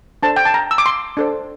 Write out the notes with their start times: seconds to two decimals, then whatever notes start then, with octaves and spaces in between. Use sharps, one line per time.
0.23 D4 A4 C5 A5
0.36 G5
0.45 A5
0.54 A#5
0.71 E6
0.78 D6
0.86 C6
1.17 D4 A4 C5